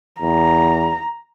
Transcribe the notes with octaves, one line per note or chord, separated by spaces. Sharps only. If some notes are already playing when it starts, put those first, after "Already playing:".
E2 A#5